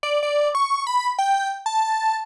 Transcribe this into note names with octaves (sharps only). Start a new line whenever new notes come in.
D5
D5
C#6
B5
G5
A5